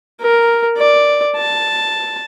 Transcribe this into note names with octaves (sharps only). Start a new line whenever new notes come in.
A#4
D5
A5